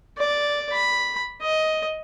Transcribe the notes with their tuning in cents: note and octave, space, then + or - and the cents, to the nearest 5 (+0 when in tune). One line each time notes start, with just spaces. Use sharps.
D5 -5
B5 +0
D#5 +10